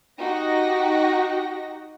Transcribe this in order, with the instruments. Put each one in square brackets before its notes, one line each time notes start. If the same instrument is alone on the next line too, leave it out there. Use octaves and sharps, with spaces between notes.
[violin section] D#4 F#4 G4 A#6